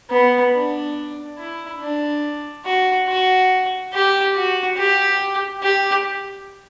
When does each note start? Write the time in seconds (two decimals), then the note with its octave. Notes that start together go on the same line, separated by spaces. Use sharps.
0.10 B3
0.54 D4
1.38 E4
1.81 D4
2.65 F#4
3.08 F#4
3.93 G4
4.35 F#4
4.77 G4
5.63 G4